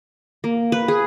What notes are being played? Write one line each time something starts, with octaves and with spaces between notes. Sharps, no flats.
A#3
B4
G#4